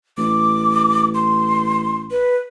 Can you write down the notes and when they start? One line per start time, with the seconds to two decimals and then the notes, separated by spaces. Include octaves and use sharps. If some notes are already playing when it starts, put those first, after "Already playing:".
0.18 A1 D6
1.14 C6
2.11 B4